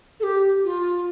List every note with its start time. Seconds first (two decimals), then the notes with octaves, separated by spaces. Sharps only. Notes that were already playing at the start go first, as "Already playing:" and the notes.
0.20 A4
0.23 G4
0.64 F4